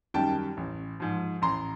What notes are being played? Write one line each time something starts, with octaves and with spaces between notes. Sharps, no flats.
F#2 D#3 G3 G5 A5
A1
G#2 F3
A1 A#5 C6